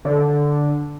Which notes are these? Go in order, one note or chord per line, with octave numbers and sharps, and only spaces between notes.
D3